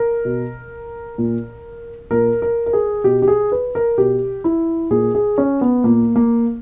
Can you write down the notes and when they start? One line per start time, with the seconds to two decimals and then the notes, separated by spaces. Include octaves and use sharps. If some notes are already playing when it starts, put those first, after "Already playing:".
Already playing: A#4
0.25 B2
1.18 A#2
2.11 A#2 A#4
2.42 A#4
2.66 A#4
2.73 G#4
3.04 B2 G4
3.22 G4
3.28 G#4
3.52 B4
3.75 A#4
3.98 B2 G4
4.44 E4
4.91 A#2 G#4
5.15 G#4
5.38 C#4
5.61 B3
5.84 A#2 A#3
6.16 A#3